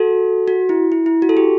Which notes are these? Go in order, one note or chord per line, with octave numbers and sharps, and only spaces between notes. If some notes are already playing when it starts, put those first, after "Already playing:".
Already playing: F#4 A4
F#4
E4
E4
E4
F#4
A4
G4